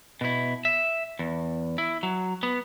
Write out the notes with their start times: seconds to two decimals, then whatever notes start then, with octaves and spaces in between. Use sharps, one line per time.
0.21 B2 E4
0.65 E5
1.19 E2
1.78 E4
2.03 F#3
2.43 B3